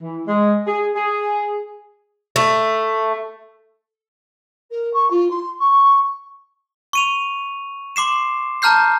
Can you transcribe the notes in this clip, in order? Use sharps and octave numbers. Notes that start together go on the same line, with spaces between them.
E3
G#3
G#4
G#4
A3
A#4
C#6
F4
C6
C#6
C#6 D#7 F7
C6 D6 C7 E7
A5 A#5 F6 G6 C7